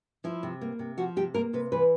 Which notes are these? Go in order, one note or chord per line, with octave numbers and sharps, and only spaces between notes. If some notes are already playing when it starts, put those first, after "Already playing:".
F3 E4
C3
A#3
C3
F3 F#4
C3 G4
A#3 A#4
C3 B4
E3 B4